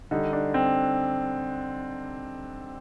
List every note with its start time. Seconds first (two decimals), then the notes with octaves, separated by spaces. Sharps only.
0.11 D3 G3 D#4
0.33 D4
0.54 C4